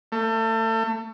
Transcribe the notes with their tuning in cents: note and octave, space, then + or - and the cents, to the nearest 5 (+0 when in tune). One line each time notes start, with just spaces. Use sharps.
A3 +35